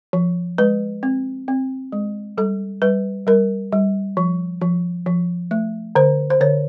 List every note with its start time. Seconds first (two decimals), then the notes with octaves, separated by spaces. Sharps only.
0.13 F3
0.58 G#3 B4
1.03 C4
1.48 C4
1.92 G#3
2.38 G3 A4
2.82 G3 B4
3.27 G3 A#4
3.72 G3
4.17 F3
4.61 F3
5.06 F3
5.51 A3
5.95 D3 C5
6.30 C5
6.41 D3 C#5